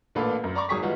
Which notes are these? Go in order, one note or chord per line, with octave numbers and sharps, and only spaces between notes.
A1 A#2 D4 A4 B4 F5
F#2
D5 A#5 B5 C#6 D6
G#1 F#3 G#4 C#6 D#6 B6
E3 G3 G#3 F4 F#4